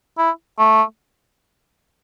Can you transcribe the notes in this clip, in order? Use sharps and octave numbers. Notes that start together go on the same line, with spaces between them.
E4
A3